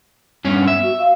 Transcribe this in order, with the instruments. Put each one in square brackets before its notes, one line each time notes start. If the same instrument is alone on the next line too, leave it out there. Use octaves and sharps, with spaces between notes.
[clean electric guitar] G2 C#4 [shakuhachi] B3
[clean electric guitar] E5
[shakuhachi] F#4
F5